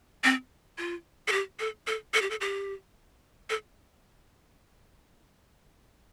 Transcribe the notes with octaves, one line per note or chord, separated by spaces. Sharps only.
C4
F4
A4
G4
A4
A4
A4
G4
A4
G4
A4